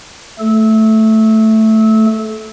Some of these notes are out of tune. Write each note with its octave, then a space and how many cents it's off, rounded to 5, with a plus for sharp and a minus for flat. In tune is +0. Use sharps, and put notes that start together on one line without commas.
A3 +0 A4 -25